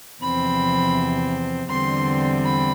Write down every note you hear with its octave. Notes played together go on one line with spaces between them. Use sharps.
E2 C3 F3 C4 B5
E2 D3 G3 C4 C6
B5